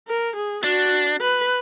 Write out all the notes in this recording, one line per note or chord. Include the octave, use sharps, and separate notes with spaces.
A#4
G#4
D4 F#4
B4